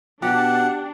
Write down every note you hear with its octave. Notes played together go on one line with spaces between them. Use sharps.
B2 D4 G4 F#5